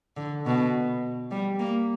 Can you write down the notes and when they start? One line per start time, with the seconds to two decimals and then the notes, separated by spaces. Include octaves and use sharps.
0.17 D3
0.46 B2
1.31 G3
1.59 A#3